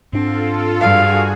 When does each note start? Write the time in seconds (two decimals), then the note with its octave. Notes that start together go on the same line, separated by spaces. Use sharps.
0.13 G#2 C4 D4 F4 A4
0.80 G2 F#4 G#4 F5 G#5